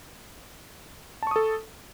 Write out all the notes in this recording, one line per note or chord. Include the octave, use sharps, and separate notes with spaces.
A4 A5 C#6 D#6